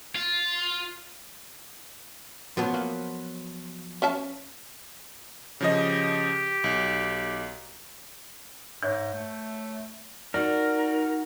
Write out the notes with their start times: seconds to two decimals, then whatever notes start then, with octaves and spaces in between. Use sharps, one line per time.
0.15 F4
2.57 C#3 F3 F#3 B3
2.74 A#3
4.02 C#4 E5 A5
5.61 C#3 F3 G4 D#5
6.64 B1
8.83 G#2 C#5 E5 G6
9.13 A3
10.34 D#4 F#4 A#4 D5